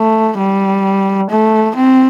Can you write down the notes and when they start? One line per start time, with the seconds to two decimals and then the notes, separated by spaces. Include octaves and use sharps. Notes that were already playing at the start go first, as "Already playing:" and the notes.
Already playing: A3
0.38 G3
1.30 A3
1.76 C4